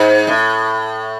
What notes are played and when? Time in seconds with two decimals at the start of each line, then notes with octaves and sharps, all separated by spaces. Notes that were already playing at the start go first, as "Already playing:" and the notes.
Already playing: G#2
0.27 A2